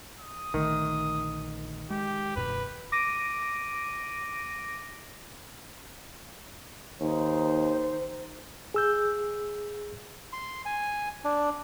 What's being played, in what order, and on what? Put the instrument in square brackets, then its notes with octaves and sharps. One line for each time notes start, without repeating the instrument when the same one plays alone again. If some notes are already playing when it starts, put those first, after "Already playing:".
[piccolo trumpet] D#6
[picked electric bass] A#1 D3 A3 [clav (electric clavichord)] D#3
[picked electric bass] G#3 [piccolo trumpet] G4
[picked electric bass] D#1 F#2 B2 [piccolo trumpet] B4
[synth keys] D6 A#6 D7 D#7
[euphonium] D#2 [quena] D#4 [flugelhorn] C5
[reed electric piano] G#4 E6 G6
[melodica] C6
G#5
D4